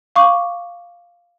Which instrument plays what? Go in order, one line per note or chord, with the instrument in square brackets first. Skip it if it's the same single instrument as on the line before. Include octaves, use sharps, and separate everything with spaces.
[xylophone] F5 C#6 D6